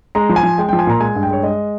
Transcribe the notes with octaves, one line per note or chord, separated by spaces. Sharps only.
G#3 A#5
F3
G#5
F3
G#3 G5
F3 G5
G#5
A#2 A#5
G#3 G#5
G2
G5
G#3 C#5
G#3 D#5